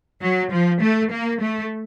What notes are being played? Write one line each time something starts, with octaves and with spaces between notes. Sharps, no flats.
F#3
F3
A3
A#3
A3